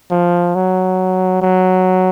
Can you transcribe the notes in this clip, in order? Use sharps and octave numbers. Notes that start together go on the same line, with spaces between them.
F3
F#3
F#3